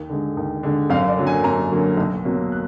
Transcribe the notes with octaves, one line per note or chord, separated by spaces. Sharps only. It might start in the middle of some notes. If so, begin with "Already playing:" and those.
Already playing: D#2
D3 G#3
D#2
D3 G#3
F#2 F5
D5
D3 F#3 A#3
G#5
F#2 A#5
D3 F#3 A#3
B1
B2 F#3 A#3
F#6